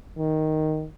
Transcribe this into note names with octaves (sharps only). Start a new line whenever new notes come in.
D#3